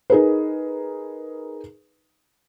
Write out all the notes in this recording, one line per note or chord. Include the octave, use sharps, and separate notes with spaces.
D#4 G#4 A#4 B4